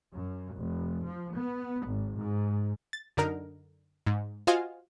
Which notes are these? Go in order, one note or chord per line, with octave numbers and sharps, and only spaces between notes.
F#2
F1
F3
B3
G#1
G#2
A6
F#2 D3 D#4 A#4
G#2
F4 F#4 C5 D#5 F5 G#5